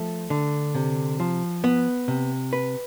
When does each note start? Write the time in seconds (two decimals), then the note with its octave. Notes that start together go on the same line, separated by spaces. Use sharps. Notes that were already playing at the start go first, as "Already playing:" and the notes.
Already playing: F3 A3
0.30 D3
0.75 C3
1.20 F3
1.64 B3
2.08 C3
2.53 B4